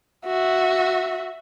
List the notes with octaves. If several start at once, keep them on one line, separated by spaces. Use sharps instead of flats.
F#4 E5